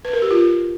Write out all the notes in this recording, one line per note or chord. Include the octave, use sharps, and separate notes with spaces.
B4
A#4
G4
F4